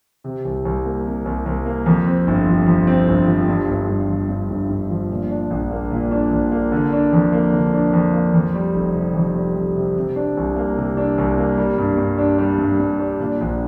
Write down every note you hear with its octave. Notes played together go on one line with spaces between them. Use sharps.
C3
C2
C2
A#3
C3
C2
C2
A#3
F2
C4
G1
F3
F2
C4
G1
F3
G2
G1
G1
F3
G2
G1
G1
F3
A#2
D4
A#1
A#3
A#2
D4
A#1
A#3
D3
D4
F2
A#3
D3
D4
F2
A#3
F2
G3
F1
C3
F2
G3
F1
C3
C3
D4
C2
A#3
C3
D4
C2
A#3
G3
G2
G2
D4
G3
G2
G2
D4
A#2
A#1